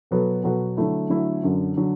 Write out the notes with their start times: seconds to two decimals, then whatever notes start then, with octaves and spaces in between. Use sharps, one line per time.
0.11 B2 F#3 B3 F#4 A4
0.44 B2 F#3 B3 F#4 A4
0.77 D3 F#3 A3 E4
1.10 D3 F#3 A3 E4
1.43 F#2 D3 F#3
1.77 D3 F#3